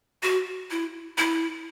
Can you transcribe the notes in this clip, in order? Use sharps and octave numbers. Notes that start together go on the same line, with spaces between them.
F#4
E4
E4